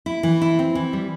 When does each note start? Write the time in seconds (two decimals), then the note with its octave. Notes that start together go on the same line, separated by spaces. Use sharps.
0.06 E4
0.23 E3
0.42 E4
0.59 C4
0.75 E3
0.93 G3